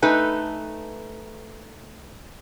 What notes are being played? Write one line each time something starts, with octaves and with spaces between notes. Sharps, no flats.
A3 D#4 B4 G#5